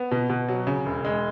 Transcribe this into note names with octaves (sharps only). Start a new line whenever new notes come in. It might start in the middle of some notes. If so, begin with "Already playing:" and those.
Already playing: B3
B2
B2
F#3
C#3
E1
G#3